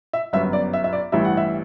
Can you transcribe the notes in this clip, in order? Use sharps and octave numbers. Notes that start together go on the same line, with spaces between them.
E5
G1 F#2 F#3 B3 E5
D5
E5
E5
D5
A1 G2 E3 G3 E5
F#5
E5